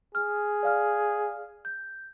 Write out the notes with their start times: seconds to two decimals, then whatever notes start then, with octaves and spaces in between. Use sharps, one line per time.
0.15 G#4 F6
0.63 D5 F5 F6
1.65 G6